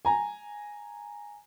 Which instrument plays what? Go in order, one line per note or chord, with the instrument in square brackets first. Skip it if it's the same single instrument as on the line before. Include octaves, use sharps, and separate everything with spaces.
[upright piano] G#5 A#5